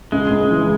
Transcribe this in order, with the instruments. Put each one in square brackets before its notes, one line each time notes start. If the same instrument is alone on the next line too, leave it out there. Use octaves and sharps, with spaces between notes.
[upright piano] C#2 [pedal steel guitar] G#3
[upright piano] C#2
E3